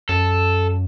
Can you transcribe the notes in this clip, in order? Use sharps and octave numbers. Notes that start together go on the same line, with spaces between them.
F#2 A4